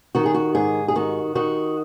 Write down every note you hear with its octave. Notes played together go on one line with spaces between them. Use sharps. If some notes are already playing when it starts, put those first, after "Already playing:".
D#3 F#4
G#4
F#4
G#2 G#4
G#4
D#3 F#4
D#3 F#4